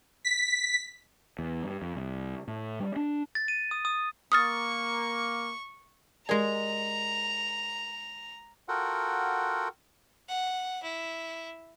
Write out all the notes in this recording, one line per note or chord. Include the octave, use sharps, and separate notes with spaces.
B6
E2
G2
F2
C2
A2
G3
D4
A6
D#7
D#6
D#6
A#3 C#6 D#6 F6 A6
G#3 G4 G#4 A#4 D5 A#5
F4 F#4 A4 A#4 F#5 G5
F#5
E4